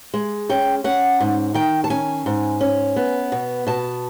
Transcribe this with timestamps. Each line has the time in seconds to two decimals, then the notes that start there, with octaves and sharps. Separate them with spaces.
0.14 G#3
0.49 C#4 G5
0.84 C#4 F#5
1.20 G#2
1.54 D#3 G5
1.84 A5
1.90 C#4 G#5
2.26 G#2
2.61 C#4
2.96 B3
3.32 B2
3.67 B2 A5